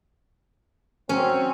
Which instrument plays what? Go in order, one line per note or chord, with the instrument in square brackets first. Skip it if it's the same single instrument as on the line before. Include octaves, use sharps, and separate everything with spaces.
[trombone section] F#3 C4 [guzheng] C#4